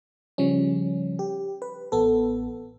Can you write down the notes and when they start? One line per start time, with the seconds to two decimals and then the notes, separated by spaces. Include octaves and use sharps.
0.38 C#3 F3 G3 C#4
1.19 G4
1.62 B4
1.92 A1 B3 A4